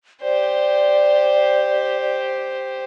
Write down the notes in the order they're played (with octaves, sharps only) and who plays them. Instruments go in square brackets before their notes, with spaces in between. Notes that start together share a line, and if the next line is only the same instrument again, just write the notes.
[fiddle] G4 C5 [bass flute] D5